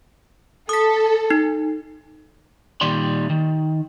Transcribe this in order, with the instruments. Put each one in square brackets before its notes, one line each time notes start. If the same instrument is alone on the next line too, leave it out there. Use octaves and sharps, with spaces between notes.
[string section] A4 [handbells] D#6 B6
[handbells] D#4
[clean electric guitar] A#2 D#3 G3 D5 C6
D#3